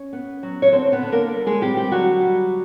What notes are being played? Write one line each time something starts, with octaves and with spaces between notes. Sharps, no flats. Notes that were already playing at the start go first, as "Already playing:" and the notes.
Already playing: C#4
B3
F#3
C#5
D3 C4 C5
B3 B4
D3
A#3 A#4
G3
G#3 G#4
G3 C4 G4
G3 G4
D3 F#3 F#4
G3